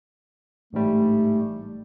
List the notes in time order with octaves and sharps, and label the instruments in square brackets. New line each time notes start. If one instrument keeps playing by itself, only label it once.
[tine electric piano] A1 G#2 G3 [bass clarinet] A3